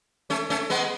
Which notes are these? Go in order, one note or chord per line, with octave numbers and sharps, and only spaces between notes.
A3 C#4
A3 C#4
G#3 B3